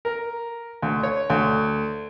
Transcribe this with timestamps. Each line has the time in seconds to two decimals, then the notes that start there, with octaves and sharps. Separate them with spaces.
0.05 A#4
0.82 D2
1.03 C#5
1.30 D2